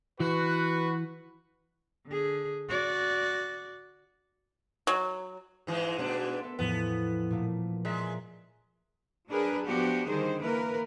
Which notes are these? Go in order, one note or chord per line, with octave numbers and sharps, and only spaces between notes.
E3 F#4 B4
D3 G#4
F#4 D5
F#3
G#2 E3 G#3
G#2 B2 A3 B3 D4
A4 E5 C6
E2 A2 F3 B3
A#2 A3 A#3
G#3 D5 E5 A#5
F#3 D4 G#4 A#4 B4
F3 B3 D4 F#4 G4
D3 D#3 G3 G#4 C5
E3 A#3 A#4 B4